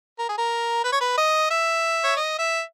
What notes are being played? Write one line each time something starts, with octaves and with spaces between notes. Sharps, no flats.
A#4
G#4
A#4
B4
C#5
B4
D#5
E5
C#5
D#5
E5